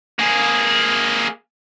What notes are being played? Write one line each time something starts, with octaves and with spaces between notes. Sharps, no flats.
A#3 G#4